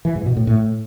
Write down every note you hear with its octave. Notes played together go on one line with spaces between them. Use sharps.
E3
G#2
B2
A2
A2